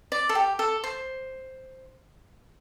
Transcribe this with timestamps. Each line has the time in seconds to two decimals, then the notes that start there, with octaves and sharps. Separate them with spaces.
0.12 D5
0.29 A4
0.35 G4
0.59 A4
0.84 C5